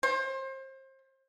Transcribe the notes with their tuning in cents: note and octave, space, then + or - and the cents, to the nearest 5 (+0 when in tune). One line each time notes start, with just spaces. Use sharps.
C5 +30